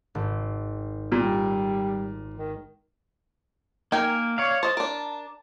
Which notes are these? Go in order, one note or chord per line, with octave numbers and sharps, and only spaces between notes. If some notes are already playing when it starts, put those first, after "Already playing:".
G#1
A#2 G3
D#3
A#3 D#4 A#4 G5 G#5
C#5 D5 F5
C5 D#5 A5
D4 A#4